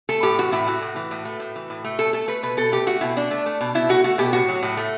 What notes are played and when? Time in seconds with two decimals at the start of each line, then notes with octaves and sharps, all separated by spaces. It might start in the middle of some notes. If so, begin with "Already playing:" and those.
0.09 A3 A4
0.23 A2 G4
0.39 E3 F#4
0.52 A2 E4
0.67 A3 F#4
0.82 A2
0.96 E3
1.11 A2
1.25 A3
1.40 A2
1.55 E3
1.70 A2
1.84 A3
1.99 B2 A4
2.13 A3 A4
2.28 A3 B4
2.43 B2 B4
2.57 B2 A4
2.72 A3 G4
2.87 A3 F#4
3.01 B2 E4
3.16 B2 D4
3.31 A3
3.46 A3
3.61 B2
3.75 B2 E4
3.89 A3 F#4
4.04 A3 F#4
4.18 B2 G4
4.33 A2 F#4
4.49 F#3
4.63 A2
4.77 A3